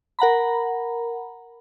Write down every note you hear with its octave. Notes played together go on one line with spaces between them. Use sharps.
A#4 F#5 A#5 B5